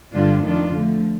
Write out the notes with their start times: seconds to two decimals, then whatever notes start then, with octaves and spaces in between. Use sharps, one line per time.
0.14 G2 D3 G3 D4 F4
0.44 F2 D#3 A3 D4 F4
0.75 D3 F3 A3